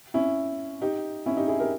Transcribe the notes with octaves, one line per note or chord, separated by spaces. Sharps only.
C#4 E4
D#4 G4
C#4 E4
D#4 G4
E4 G#4
G4 A#4